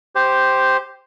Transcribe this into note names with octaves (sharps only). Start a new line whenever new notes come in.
G4 C5